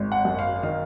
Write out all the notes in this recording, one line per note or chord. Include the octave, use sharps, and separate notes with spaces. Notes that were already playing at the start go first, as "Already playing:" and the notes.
Already playing: G#1
F#5
F#2
F5
D#3 F5